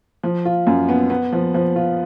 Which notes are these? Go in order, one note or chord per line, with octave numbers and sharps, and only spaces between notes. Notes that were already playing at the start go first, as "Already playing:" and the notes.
F3
F4
F#2
B3
B3
F3
F3
F4